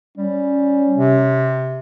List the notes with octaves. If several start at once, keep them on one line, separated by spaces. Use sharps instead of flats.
G3 C#4
C3